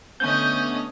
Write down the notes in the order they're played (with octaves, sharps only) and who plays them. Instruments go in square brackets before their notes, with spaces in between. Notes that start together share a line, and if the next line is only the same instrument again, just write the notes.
[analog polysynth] D3 A3 B3 [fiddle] C#4 D#5 [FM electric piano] G6